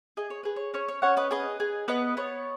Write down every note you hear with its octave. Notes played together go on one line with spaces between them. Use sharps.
G#4 D#5
C#5
G#4 B4
C#5
C#4 C#5
C#5
C#4 C#5 F#5
B4 D#5
G#4 B4 D#5
G#4
B3 B4 D#5
B3 C#5